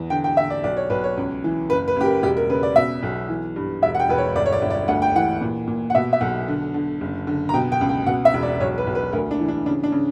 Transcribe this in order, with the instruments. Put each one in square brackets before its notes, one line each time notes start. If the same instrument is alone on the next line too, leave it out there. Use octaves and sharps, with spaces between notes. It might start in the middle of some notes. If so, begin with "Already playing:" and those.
Already playing: [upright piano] E2
D3 G5
G5
D3 E5
D5
B1 D5
C#5
B1 B4
C#5
C#2
E3
F#1 B4
B4
F#1 G4
A#4
E1 G4
A#4
C#3 B4
D5
B2 E5
B1
E3
G2
E1 E5
F#5
G5
E1 B4
C#5
G1 D5
C#5
D5
G1
D5
D2 F#5
G5
E3 F#5
A#2
A#2
F#5
B2 E5
E5
B1 F#5
D3
D3
F#1
D3
A#5
B2 G5
G5
C#2
G5
B2 F#5
E5
E1
D5
B1 C#5
B4
B1
B4
D2 A#4
D4
E3
D4
C#3 D4
D4
C#3